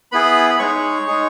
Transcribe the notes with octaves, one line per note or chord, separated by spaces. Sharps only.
B3 E4 G#4 B4 B5
B5
G#3 D#4 G#4 C#5 C#6
G#3 D#4 G#4